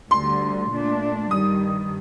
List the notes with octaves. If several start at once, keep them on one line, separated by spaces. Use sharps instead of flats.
D2 D3 G3 C6
A#2 A3 D4
G2 D#3 G3 D#6